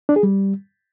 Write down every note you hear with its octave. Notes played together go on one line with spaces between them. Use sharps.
D4
G#4
G3